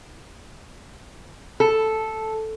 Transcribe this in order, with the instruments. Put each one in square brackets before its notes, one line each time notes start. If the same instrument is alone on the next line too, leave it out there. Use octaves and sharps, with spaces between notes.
[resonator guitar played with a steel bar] A4